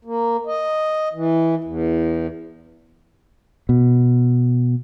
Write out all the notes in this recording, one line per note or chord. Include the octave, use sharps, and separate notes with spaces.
A#3
D#5
E3
E2
B2